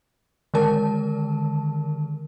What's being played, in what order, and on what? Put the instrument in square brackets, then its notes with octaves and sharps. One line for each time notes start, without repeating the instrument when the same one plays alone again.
[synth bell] D3 D#3 G#3 A#4 A5